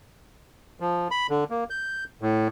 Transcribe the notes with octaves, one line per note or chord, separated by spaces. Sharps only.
F3
B5
D3
A#3
G6
A2